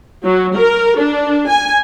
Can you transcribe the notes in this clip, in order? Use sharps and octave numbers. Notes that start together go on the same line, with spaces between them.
F#3
A#4
D4
G#5